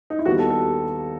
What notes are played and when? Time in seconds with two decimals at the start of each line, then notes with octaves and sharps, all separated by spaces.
0.10 D#4
0.19 E4
0.25 D#2 D#3 G3 B3 F#4
0.39 A4
0.50 A4